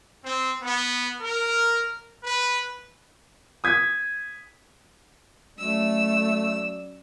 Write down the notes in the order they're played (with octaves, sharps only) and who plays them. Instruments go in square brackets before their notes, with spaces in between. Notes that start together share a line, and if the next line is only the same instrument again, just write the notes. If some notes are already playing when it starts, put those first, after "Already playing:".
[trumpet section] C4
B3
A#4
B4
[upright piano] D#6 G#6 B6
[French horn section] F#3 C#4 D5 [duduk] A3 [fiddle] E6